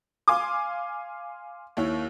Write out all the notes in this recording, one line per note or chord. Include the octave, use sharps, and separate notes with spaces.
F5 G#5 C6 D6
D#2 D#3 E4 C#5